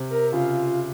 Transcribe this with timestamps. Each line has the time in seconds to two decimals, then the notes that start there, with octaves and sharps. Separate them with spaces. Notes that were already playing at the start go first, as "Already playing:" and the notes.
Already playing: C3
0.10 A#4
0.32 C#3 F4